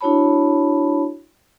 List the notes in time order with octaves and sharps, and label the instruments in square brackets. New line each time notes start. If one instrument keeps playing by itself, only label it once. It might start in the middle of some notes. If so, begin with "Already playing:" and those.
[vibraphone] D4 E4 F#4 C#5 A5 B5